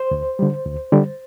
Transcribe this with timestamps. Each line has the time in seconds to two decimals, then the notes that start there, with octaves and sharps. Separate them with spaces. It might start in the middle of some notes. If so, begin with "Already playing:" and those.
Already playing: C5
0.11 D2
0.39 D3 G3
0.65 D2
0.92 D3 G3